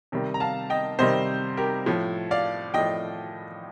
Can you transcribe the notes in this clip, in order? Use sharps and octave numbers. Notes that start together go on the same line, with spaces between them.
C3 D#3 G3
A#5
F5 A5
D#5 G5
C3 D#3 G3 C5 D#5
G4 A#4
A2 F3
D5 F5
A2 F3 D#5 G5